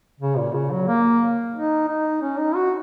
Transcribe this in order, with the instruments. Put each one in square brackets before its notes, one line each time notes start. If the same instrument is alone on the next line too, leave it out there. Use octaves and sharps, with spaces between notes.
[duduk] C#3
A#2
C#3
F#3
A#3
D#4
D#4
C#4
D#4
F#4